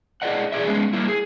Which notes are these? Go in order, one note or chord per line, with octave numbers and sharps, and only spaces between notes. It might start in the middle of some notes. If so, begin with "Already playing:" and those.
E4 G#4 D5 D#5 F#5
B2 G#4 D5 E5
G#3 B3 C#4 G#4
G3 A#3 E4
G#4